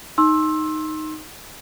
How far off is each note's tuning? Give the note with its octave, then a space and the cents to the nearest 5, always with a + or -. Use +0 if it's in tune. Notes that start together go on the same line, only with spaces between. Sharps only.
D#4 +0 C6 +25 E6 +0